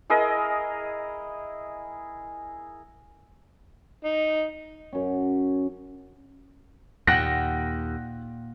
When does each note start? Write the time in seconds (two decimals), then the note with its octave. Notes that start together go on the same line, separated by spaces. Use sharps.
0.10 E4 G#4 A#4 D#5
4.04 D#4
4.93 F#2 C#4
7.07 D#2 A#2 F#5 G5 F#6 A#6